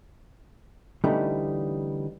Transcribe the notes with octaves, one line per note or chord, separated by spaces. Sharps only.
D3 E3 G3 A3 C#4 D#4